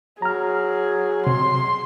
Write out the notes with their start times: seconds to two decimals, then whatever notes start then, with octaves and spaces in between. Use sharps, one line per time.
0.22 F#3 G#4 A#5 F6
1.27 C3 C6